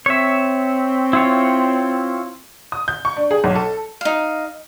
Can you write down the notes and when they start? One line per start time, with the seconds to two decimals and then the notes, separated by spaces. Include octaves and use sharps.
0.06 C4 C#5 E5
1.13 E4 F4 C#5
2.72 D#6
2.88 G6
3.05 C#6
3.17 D4
3.31 G#4
3.44 B1
3.55 A4
4.01 D#4 F5